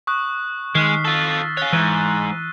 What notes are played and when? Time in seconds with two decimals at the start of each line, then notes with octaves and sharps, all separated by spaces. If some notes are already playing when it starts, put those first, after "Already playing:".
0.07 C#6 D#6 F#6
0.75 D#3 G#3 F6 B6 C7
1.05 F4 A4 E6 A6 C7
1.57 C#5 F5 F#6 A6 G7
1.73 G#2 E3 E6 F#6 D#7